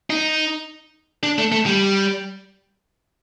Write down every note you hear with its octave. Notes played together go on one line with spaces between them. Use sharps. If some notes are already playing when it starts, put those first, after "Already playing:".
D#4
D4
A3
A3
G3